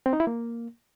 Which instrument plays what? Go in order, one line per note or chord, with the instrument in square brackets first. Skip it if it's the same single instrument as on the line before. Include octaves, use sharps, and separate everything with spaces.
[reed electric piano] C4
D#4
E4
A#3